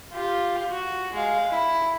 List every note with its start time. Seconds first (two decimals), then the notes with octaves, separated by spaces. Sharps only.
0.12 F4 G4
0.71 F#4
1.13 G#3 F5
1.51 E4